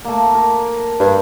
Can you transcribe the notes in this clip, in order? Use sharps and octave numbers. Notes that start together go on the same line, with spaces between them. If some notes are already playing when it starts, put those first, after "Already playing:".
A3 A#3
A#4
G2